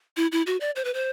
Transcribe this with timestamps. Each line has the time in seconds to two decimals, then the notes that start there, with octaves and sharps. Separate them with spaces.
0.17 E4
0.32 E4
0.47 F#4
0.61 D5
0.76 C5
0.85 B4
0.94 C5